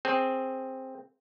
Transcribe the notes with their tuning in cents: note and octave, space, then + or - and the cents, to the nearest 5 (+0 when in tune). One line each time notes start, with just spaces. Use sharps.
C4 +5 G#4 +0